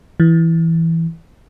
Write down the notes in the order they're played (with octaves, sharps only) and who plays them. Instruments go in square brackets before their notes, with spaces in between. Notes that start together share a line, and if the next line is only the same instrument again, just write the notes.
[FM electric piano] E3